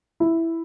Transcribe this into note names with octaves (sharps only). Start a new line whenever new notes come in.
E4